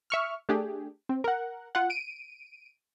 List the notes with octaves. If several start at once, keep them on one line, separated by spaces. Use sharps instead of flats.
E5 C#6 F6
A3 D4 G4 G#4
C4
A#4 F#5
F4 F#5
D7 D#7